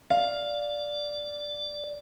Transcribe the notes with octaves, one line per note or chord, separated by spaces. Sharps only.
D5 F5